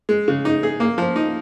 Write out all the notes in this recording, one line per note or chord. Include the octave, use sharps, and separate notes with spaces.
G#3
C#3
D#4
G#4
A#3
F3
D#4